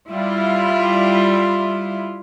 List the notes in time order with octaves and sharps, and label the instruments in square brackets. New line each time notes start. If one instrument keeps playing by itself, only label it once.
[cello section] G3 E4 F4